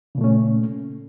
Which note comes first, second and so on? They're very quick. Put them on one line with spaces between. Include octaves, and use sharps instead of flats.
C#3 A#2 A3 C#4